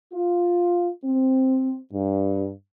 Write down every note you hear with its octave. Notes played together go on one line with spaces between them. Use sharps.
F4
C4
G2